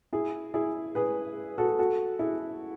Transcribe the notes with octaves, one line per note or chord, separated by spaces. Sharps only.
E4 G#4
E4 G#4
G#4 B4
F#4 A4
F#4 A4
E4 G#4